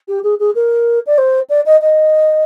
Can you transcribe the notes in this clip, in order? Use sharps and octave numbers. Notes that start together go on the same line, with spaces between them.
G4
G#4
G#4
A#4
D5
C5
D5
D#5
D#5